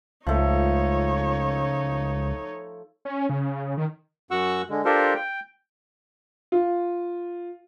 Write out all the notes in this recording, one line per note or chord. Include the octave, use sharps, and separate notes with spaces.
C#2 F3 A3 D#4 C#5
C#4
C#3
D#3
F#2 F#4 F#5 C#6 E6
D3 G#3
D4 F4 G4 A4 A#4 C5
G5
F4